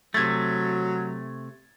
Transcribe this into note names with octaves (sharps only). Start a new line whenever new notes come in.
C3 F#3 A3 G#6 A6